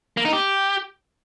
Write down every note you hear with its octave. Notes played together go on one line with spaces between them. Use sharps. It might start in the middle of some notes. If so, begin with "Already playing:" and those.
A#3
D#4
G4